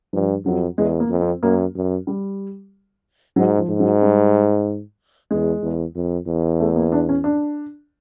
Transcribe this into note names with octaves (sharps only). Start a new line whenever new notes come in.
G2 F3
F2 F#3
E2 G#3
A#3
F2
C4
F#2 A#3
F#2
G3
G#2 F#3
F3
G#2
F#3
G3
E2 G#3
E2
F2
E2
A3
A#3
D4
C#4
D4